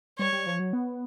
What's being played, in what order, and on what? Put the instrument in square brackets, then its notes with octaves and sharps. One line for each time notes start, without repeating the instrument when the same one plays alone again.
[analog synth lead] G3 [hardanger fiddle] C#5
[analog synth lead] G3
F3
F#3
B3